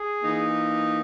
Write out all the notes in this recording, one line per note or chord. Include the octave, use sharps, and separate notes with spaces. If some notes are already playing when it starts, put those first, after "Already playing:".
Already playing: G#4
E3 A#3 D#4